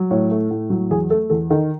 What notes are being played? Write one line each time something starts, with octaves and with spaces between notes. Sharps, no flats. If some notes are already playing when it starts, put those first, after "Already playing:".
Already playing: F#3
A2 C#5
A3
A2
F#3
E2 G#4
A3 A4
E2 A4
D#3 A4